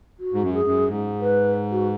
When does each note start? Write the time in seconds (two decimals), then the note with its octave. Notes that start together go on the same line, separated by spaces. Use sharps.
0.20 F#4
0.33 G#2
0.43 F#2
0.54 G#4
0.65 F#2
0.87 G#2
1.21 B4
1.72 F#4